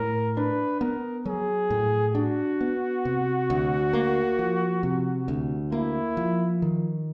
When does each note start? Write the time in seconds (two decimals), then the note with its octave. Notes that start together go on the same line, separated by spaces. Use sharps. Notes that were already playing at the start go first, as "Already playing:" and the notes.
Already playing: A2 A#4
0.37 D4 B4
0.81 B3 A#4
1.25 F#3 G#4
1.70 A2
2.15 D4 F#4
2.61 B3
3.05 C3
3.50 D2
3.93 A#3
4.39 F3
4.83 C3
5.28 D2
5.72 A#3 E4
6.17 F3
6.62 D#3